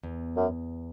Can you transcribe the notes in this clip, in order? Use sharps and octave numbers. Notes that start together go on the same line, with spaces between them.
E2
F#2